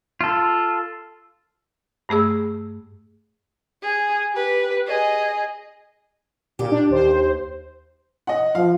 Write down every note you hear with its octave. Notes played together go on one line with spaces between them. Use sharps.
F4 A4
G2 A3 G#4 E6
G#4
G4 B4
G#4 D#5
A#2 G4
D4
D#2 C5
D#5 F#5
F3 F5